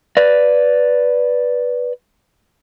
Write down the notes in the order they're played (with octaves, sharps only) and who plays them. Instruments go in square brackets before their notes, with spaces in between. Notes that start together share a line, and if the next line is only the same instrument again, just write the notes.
[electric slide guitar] B4 D5